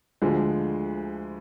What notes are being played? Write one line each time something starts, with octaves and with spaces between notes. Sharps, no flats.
D2 D3 F3 G#3